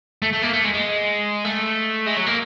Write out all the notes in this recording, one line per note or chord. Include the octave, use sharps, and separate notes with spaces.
A3
A3
A#3
A3
G#3
G#3
A3
G#3
F#3
A#3